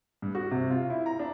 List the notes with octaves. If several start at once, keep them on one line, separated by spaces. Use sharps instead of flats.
G2
F#4
C3
F4
E4
A#5
D4